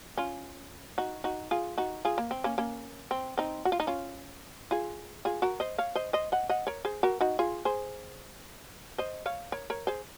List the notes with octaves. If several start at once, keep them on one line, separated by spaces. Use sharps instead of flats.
C#4 F4
D#4 F#4
D#4 F#4
F4 G#4
D#4 F#4
F4 G#4
A#3
C4
A#3 C#4
A#3 C#4
C4
C4 D#4
F#4
F4
D#4
C#4 F4
F4 G#4
F4 G#4
F#4 A#4
C5 D#5
C#5 F5
C5 D#5
C5 D#5
D#5 F#5
D#5 F#5
A#4 C#5
G#4 C5
F#4 A#4
D#4 F#4
F4 G#4
G#4 C5
C5 D#5
C#5 F5
A#4 C#5
A#4 C#5
G#4 C5